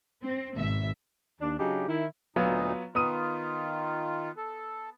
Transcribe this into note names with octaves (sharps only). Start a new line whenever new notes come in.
C4
G#1 B2 E5
D#2 D4
C#3 F#3 D4 D#4 F#4 G4
D#3 E4
D2 A#2 F#3 B3 D#4 F4
D#3 B3 F4 D#6 D#7
A4